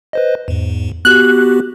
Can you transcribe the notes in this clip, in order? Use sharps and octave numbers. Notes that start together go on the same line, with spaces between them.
B4 C5 D#5
E2 G#2
B3 F#4 G4 F#6